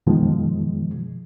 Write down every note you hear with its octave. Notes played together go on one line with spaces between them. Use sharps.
F#2 B2 D#3 F3 G#3